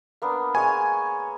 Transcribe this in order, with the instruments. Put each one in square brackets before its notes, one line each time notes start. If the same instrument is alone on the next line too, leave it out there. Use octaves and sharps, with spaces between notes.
[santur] A#3 B3 D4
[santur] G#3 C#5 [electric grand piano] G#5